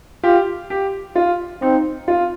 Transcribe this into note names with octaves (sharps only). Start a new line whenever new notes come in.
F4 G4
G4
F4
C4 D#4
F4